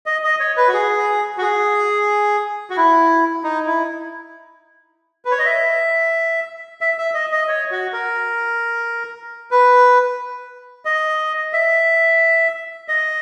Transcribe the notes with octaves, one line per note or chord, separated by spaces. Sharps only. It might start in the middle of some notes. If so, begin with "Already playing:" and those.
D#5
D#5
C#5
B4
F#4
G#4
F#4
G#4
F#4
E4
D#4
E4
B4
C#5
D#5
E5
E5
E5
D#5
D#5
C#5
F#4
A#4
B4
D#5
E5
D#5